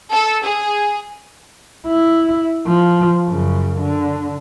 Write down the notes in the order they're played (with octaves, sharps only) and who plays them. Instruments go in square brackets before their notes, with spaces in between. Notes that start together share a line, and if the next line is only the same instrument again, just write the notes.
[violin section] A4
G#4
[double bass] E4
F3
F#2 C#3
D3